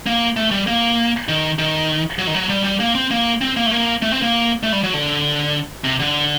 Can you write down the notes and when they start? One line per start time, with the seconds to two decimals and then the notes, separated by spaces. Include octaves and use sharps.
0.06 A#3
0.37 A3
0.51 G3
0.67 A#3
1.29 D#3
1.59 D#3
2.19 F#3
2.27 D#3
2.34 F#3
2.49 G3
2.64 G3
2.80 A#3
2.95 C4
3.11 A#3
3.41 C4
3.56 A#3
3.66 A3
3.71 A#3
4.02 A3
4.12 C4
4.22 A#3
4.63 A3
4.72 G3
4.83 F#3
4.94 D3
5.84 C3
6.00 D3